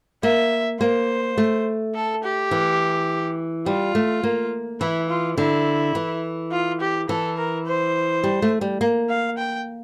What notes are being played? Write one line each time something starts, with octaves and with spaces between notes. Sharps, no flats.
A#3 E5
A#3 C5
A3
A4
G4
E3
G3 F4
A3
A#3
E3 E4
F4
D3 E4
E3
F4
G4
E3 A4
A#4
C5
G3
A3
G3
A#3
F5
G5